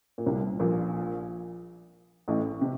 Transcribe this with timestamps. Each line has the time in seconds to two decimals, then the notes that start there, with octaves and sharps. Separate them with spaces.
0.18 A#2
0.26 C2 C3
0.60 A#1 A#2
2.28 A1 A2
2.61 C3